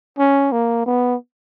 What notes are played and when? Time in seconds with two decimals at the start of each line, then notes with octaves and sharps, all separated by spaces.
0.18 C#4
0.52 A#3
0.86 B3